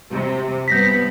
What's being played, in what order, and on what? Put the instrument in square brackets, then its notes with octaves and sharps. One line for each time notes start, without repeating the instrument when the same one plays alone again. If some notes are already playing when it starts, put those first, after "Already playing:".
[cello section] C3
[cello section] G2 B3 [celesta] G6 A#6 B6